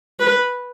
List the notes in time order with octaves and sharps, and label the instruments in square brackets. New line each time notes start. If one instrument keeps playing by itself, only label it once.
[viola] B4